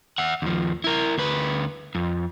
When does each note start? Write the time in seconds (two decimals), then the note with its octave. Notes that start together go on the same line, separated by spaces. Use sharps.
0.18 E5 F#5
0.42 D#2 F3
0.84 E4 A#4
1.18 D2 B4
1.95 F2